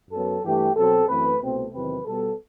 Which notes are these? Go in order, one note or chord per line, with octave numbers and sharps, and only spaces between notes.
F#2 F#3 B3 A4
G2 E3 A3 G4
B2 F#3 C4 A4
F#2 E3 A3 C4 B4
C2 B2 A3 C4
E2 C3 D#3 F#3 C4 B4
B2 G3 B3 A4